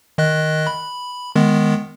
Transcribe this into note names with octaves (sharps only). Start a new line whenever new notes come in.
D#3 D#5 F#6
B5
D#3 G#3 B3